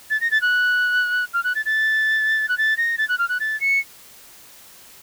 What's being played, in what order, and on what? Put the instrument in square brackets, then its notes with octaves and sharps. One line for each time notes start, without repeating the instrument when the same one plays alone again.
[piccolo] A6
A#6
A6
F#6
F6
F#6
A6
A6
F#6
A6
A#6
A6
F#6
F6
F#6
A6
C#7